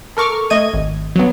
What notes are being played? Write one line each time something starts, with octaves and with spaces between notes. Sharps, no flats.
A4 A#4 C#6 D6 F6
A3 D#5 G#6 D#7
G#1
F#3 B3